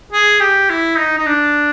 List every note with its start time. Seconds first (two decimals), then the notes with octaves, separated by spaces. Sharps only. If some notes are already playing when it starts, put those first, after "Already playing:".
0.13 G#4
0.40 G4
0.70 E4
0.98 D#4
1.18 D#4
1.26 D4